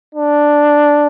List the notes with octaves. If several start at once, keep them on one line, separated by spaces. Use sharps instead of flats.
D4